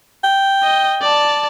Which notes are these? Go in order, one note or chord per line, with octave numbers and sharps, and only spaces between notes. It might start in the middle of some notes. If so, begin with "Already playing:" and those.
G5
D#5
D5 A5